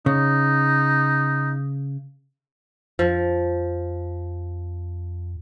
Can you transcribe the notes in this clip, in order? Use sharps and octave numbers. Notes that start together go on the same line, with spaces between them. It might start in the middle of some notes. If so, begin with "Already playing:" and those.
C#3 D#4
F2 F3